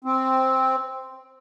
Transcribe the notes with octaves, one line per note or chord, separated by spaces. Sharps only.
C4